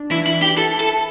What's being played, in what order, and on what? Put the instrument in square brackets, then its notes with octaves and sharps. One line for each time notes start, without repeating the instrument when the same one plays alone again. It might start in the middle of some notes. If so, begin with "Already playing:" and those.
Already playing: [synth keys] D4
[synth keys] E3 [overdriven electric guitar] E4
[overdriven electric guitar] E4
[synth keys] E3
[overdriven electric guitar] G4
[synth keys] E4 [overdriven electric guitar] A4
[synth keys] E4 [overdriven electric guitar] A4